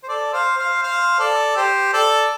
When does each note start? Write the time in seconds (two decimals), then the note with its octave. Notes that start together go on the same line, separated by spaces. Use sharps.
0.03 C5
0.08 A4 D5
0.33 C5 F5
0.57 C5 F5
0.82 C5 F5
1.19 A4 D5
1.56 G4 C5
1.93 A4 D5